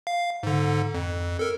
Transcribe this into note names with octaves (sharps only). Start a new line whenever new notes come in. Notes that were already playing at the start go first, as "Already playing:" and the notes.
F5
G#2 D3
F2
A4 A#4